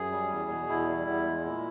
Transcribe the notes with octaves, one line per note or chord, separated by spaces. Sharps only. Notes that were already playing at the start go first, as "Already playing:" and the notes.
Already playing: F#2 G#4
G3
E2
B2
E2 E4
G3
E2
G#3
A#2